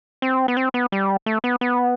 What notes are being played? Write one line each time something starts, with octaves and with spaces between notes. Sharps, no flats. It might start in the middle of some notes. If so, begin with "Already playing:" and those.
C4
B3
C4
B3
G3
A3
B3
B3